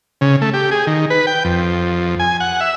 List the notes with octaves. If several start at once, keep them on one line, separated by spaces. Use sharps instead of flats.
C#3
A3
G4
G#4
D#3
B4
G5
F2
G#5
F#5
E5